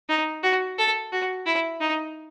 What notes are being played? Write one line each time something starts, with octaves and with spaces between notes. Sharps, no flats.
D#4
F#4
A4
F#4
E4
D#4